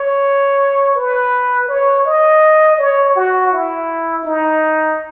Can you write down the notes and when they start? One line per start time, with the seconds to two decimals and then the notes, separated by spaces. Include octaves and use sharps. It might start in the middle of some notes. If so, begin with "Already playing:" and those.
Already playing: C#5
0.96 B4
1.69 C#5
2.06 D#5
2.79 C#5
3.16 F#4
3.53 E4
4.25 D#4